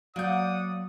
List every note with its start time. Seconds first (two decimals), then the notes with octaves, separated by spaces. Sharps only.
0.16 F#3 A#3 D5 F#5 D#6 G6